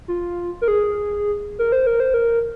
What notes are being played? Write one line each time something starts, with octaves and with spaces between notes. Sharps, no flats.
F4
A#4
G#4
A#4
C5
A#4
C5
A#4